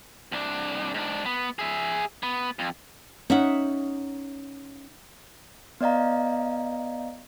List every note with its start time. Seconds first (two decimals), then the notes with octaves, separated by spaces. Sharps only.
0.32 C2 D4
0.94 G#2 D4
1.26 B3
1.59 G#4 E5
2.23 B3
2.59 F2
3.30 C#4 D#4 E5 F#5
5.81 B3 D5 D#5 F5 A#5